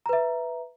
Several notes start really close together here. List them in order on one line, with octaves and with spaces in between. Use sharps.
A#5 B4 E5